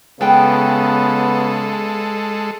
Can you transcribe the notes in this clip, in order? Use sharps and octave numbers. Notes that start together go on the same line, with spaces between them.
C#3 G#3 B3 A4 B4 G5